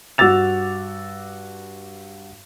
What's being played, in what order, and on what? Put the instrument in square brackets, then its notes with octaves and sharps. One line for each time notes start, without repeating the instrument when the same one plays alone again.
[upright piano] G2 F#4 D6 E6 A6 F7